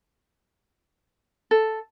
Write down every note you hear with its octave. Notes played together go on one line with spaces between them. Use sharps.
A4